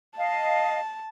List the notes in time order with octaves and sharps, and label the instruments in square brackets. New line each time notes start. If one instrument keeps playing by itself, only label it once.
[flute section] D#5 F5 [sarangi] A5